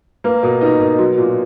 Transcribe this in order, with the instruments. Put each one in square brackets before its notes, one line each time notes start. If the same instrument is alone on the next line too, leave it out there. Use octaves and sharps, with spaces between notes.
[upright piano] A#3 [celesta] B4
[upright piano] B2 [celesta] A#4
[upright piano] D#4 [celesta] B4
[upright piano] B2 [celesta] A#4
[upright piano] F#3 [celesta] F#4
[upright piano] A#2 [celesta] F#4